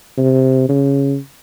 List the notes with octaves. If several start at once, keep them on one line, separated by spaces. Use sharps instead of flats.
C3
C#3